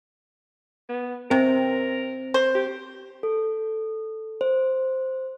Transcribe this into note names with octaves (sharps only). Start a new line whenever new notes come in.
B3
C3 C4 A#4
C5
G4
A4
C5